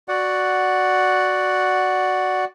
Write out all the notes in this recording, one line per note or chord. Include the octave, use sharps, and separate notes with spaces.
F#4 D5 F#5